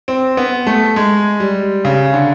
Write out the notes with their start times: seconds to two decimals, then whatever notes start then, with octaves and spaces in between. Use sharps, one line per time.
0.08 C4
0.37 B3
0.67 A3
0.96 G#3
1.40 G3
1.85 C#3
2.14 D3